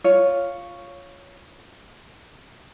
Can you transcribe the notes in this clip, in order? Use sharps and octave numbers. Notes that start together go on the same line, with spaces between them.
F4 C#5